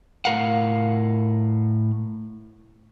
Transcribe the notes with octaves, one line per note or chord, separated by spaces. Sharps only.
A2 A#4 F5 F#5